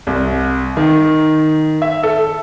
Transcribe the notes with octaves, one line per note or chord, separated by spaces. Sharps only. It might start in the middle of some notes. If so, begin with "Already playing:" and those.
C2
D#3
E5
A4